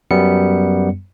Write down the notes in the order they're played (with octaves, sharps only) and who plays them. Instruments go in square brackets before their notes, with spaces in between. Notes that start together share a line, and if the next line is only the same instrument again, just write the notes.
[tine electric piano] F#2 G3 B3 C#7